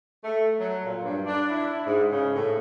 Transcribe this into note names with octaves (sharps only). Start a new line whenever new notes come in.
A3
F#3
A#2
G2
D4
E4
G#2
C#3
A2